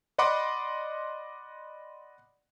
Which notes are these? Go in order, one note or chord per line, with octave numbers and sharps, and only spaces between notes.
D5 D#5 F#5 B5 C6 D6